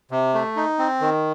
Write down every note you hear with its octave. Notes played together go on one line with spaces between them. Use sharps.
C3
A3
D#4
C4
D#3